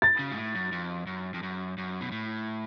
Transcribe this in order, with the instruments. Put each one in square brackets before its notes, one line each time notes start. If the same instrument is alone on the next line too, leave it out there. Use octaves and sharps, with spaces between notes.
[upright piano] A6
[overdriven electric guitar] C#3
G#2
A2
F#2
F2
F#2
F2
F#2
F#2
B2
A2